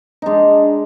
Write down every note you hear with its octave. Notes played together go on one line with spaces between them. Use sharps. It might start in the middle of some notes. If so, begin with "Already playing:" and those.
G#3 D4 D#4